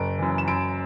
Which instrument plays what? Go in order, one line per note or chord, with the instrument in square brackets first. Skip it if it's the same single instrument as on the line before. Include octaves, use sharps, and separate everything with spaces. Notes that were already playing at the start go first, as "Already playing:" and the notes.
Already playing: [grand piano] F#1 D7
F#2 E3
E7
F#2 D7